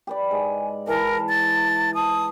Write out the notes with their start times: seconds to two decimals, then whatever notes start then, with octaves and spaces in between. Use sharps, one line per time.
0.07 G4 B4 D5
0.31 G#2 G#5
0.87 E3 A#4 A5
1.29 A6
1.94 A5 D#6